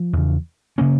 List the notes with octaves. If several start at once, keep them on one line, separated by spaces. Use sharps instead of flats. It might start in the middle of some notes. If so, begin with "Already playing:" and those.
Already playing: F3
E2 C#3
C#3 A#3 C#4